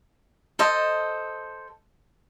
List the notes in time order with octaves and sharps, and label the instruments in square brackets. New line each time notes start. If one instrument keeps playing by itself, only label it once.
[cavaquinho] A4 C5 D#5